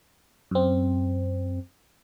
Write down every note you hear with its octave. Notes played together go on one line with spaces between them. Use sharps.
F#2 C4